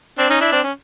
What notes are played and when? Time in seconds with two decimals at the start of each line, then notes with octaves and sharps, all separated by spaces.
0.18 C4 D4
0.30 C#4 D#4
0.41 D4 E4
0.52 C4 D4
0.63 C#4